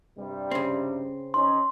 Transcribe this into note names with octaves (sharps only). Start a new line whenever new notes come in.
G2 C3 G3
C#3 C4
C#4 D#4 C6